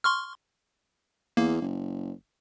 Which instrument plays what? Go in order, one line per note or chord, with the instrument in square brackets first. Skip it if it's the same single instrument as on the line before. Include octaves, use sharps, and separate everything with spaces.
[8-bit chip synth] C6 C#6 F6
[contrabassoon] E2 [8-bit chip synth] A#3
[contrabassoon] F#1